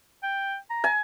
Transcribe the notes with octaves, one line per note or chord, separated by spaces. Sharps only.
G5
A#5
G#5